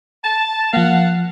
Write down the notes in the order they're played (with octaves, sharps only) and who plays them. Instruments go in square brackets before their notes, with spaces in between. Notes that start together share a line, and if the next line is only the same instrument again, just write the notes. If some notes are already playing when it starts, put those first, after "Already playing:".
[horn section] A5
[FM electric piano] F3 A#3 [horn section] F5 F#5